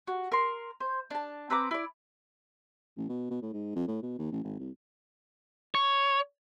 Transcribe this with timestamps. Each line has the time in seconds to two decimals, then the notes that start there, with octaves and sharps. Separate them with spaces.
0.07 F#4
0.32 A#4 C6
0.80 C5
1.10 D4 A5
1.50 C4 B4 A#5 D6
1.71 E4 D5
2.97 A1
3.09 B2
3.31 B2
3.42 A2
3.53 G#2
3.75 F2
3.88 A2
4.02 B2
4.19 D#2
4.32 A1
4.44 G#1
4.59 C2
5.75 C#5